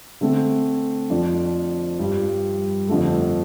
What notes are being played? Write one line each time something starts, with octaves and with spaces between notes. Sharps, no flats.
D3 A3 C4
F2 F3 D4 F4
G2 G3 F4
F2 D3 A3